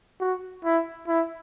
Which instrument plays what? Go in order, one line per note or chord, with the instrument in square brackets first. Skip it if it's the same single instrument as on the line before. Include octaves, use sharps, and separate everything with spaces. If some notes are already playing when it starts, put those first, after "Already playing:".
[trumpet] F#4
E4
E4